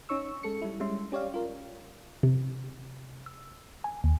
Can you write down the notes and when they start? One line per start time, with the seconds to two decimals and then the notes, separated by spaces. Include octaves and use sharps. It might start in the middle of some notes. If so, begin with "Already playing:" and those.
0.09 C#4 D#4 C#5 C#6 E6
0.43 G#3 A4 C#7
0.62 G3 E4
0.80 G3 G#3 C#4 E5 C6
1.12 C#4 G4 C#5 D5 F5
1.34 F4 A#4
2.23 C3
3.26 E6
3.84 G#5
4.04 D#2